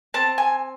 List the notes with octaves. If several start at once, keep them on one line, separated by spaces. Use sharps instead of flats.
C4 A5
G#5